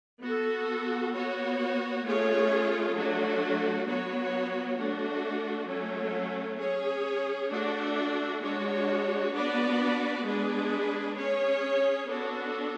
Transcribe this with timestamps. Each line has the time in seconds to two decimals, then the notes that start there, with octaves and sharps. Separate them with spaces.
0.22 B3 F#4 A4
1.13 B3 F#4 C#5
2.04 A3 C#4 F4 G#4 C#5
2.95 F#3 A3 D4 F#4
3.86 F#3 B3 F#4 C#5
4.78 A3 D4 F#4
5.69 F#3 A3 C#4
6.60 C#4 G#4 C#5
7.51 A3 D4 F#4
8.42 G#3 D4 F#4 C#5
9.33 B3 D4 F#4 B4 D5
10.24 G#3 B3 D4 G#4 B4
11.15 C#4 G#4 C#5
12.06 B3 D4 F#4 A4